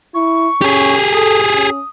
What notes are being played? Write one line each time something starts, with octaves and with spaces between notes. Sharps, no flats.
E4 C#6
C#4 G4 G#4
A4 D#6
C#4